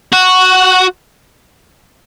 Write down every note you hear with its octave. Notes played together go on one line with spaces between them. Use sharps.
F#4